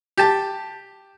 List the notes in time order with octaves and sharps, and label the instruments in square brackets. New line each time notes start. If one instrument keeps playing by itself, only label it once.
[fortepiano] G4 A5